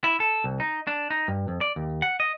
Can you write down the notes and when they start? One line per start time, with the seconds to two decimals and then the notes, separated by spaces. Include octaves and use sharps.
0.04 E4
0.20 A4
0.44 C2
0.60 D#4
0.87 D4
1.10 D#4
1.28 G2
1.48 F2
1.61 D5
1.76 D#2
2.02 F#5
2.20 D#5